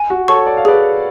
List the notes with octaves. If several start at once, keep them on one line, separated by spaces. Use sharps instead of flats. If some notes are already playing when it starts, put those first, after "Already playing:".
Already playing: G#5
F#4
A4 C#5 C#6
D5
F5
G#4 B4 D5